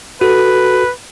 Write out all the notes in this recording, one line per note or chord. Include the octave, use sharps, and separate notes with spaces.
F#4 A4 B4